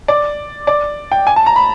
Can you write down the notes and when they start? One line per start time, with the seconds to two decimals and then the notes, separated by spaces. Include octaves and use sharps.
0.08 D5
0.67 D5
1.12 G5
1.27 G#5
1.36 A5
1.46 A#5
1.56 B5